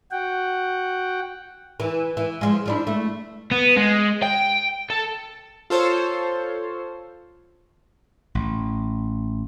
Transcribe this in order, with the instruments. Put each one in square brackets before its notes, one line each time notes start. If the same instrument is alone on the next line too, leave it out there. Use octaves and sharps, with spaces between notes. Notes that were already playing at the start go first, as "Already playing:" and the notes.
[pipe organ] F#4 F#5 G5
[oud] E3
E3
F3 G#3
F3 D4 E4
A3
[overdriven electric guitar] B3
G#3
G5
A4
[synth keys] F4 A4 C5 C#5
[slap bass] A1